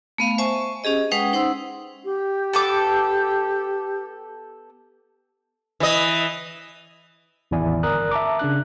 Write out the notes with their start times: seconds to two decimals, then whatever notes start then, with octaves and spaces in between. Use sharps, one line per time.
0.18 A3 B3 F5
0.38 C5 E5 G#5 A5 C#6
0.84 C#4 G4 G#4 D#5
1.11 G#3 C#4 B4 F#5 G5 D#6
1.33 D#4 C5 F#5 C6 E6
2.04 G4
2.53 B3 A4 D6
5.80 E3 D#5
7.51 A1 E2 D#3 E4 D5 G#5
7.83 G1 A#4 D5 A#5 D#6 F#6
8.11 E5 A5 A#5 D6
8.39 C#3 D4 F#6